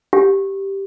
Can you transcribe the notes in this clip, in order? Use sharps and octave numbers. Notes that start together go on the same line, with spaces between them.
G4